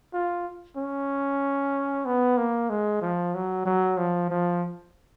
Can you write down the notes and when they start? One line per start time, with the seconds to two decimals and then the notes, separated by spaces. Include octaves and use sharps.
0.13 F4
0.77 C#4
2.06 B3
2.37 A#3
2.69 G#3
3.02 F3
3.34 F#3
3.66 F#3
3.98 F3
4.30 F3